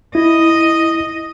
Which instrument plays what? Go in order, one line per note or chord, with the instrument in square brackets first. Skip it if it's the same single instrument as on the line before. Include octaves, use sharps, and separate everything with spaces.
[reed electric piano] E4 [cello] D#5